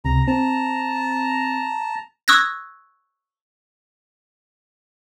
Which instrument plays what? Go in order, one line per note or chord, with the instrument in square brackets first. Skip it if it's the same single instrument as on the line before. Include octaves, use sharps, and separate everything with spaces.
[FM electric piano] C#2 C3 [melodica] A#5
[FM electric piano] C4 [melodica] A5 A#5
[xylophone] C#6 D#6 E6 F#6 G#6 A#6